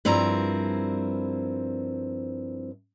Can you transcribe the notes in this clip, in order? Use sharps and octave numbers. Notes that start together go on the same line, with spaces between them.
G2 F3 C4 E4 A#4 A#5